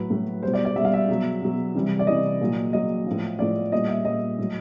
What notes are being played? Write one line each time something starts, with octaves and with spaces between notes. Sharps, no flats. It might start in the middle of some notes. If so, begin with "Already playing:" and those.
Already playing: A2 F#3 B4
A2 F#3
B2 G3 C5
D5
D5
B2 G3 E5
F5
E5
B2 F#3
B2 F#3
C3 E3 G3
D5
C3 E3 G3 D#5
A#2 F#3
A#2 F#3 D#5
A2 F3
A2 F3 D5
A#2 G3 D#5
E5
A#2 G3 D#5
A2 F#3